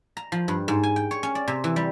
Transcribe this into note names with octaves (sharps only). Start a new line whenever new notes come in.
A#5
F3
G2
G#2
G#5
G5
C#5
C#4
D5
C3
E3
G3